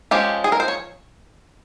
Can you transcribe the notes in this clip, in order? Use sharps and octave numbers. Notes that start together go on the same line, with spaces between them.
F3 G#3 C#4 G4
G#4
A#4
C5
C#5